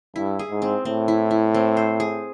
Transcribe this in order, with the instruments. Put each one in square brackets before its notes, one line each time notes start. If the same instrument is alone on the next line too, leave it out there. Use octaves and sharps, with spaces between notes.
[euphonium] G2 [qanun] E4
[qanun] G#4
[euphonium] G#2
[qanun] C4
[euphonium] A2 [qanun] C4
[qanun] E4
E4
C4
C5
G#4